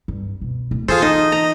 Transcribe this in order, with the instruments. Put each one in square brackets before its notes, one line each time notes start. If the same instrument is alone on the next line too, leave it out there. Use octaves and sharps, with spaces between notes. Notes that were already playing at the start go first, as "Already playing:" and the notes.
[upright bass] G2
B2
D1
[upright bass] E3 [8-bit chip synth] F4 G#4 C5 [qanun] A4
[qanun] D#4 C5 [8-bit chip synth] D#5
[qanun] A#5